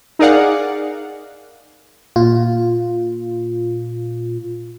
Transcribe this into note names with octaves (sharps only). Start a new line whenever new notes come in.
D#4 G#4 A#4 D5 F5 F#5
A#2 F4